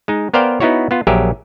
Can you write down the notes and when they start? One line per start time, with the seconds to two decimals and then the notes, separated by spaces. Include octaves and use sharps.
0.08 G#3 D#4
0.34 B3 A#4 C5 D5 F5 G5
0.60 B3 D#4 E4 F#4 C#5
0.91 B3 F4
1.07 A#1 F#3 G4 G#4 A#4 E5